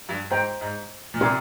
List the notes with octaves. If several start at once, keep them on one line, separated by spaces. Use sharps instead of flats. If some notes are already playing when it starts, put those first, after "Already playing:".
G2
G#2 C5 G5 A#5
G#2
A#2
C3 G4 A#4 D5 G#5 C6